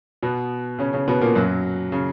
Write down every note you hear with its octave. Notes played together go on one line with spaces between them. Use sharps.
B2 B3
C#3 C#4
C#3 C#4
B2 B3
A#2 A#3
F#2 F#3
C#3